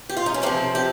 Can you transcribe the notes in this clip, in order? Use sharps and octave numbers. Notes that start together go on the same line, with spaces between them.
G4
F4
D#4
C#4
F2 C3 F3 C4
G4